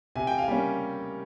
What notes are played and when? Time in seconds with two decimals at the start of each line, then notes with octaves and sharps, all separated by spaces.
0.16 C3 G#5
0.27 G5
0.38 F5 G#5
0.48 G3 A#3 C#4